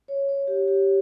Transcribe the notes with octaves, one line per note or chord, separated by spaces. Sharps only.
C#5
C#5
G4
G4